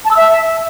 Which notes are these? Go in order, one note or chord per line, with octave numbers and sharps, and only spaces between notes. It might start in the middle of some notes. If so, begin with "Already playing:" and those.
A5
E6
E5